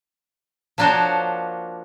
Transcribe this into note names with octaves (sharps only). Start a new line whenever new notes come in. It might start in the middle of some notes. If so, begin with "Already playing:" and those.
F3 A#3 D4 F#4 C5 C#5